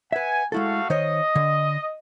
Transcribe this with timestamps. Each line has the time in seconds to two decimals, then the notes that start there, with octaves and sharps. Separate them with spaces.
0.12 B4 E5 F#5 G#5
0.52 G#3 A3 E4 F#4 A4 F5
0.90 D#3 C5 C#5 D#5
1.36 D3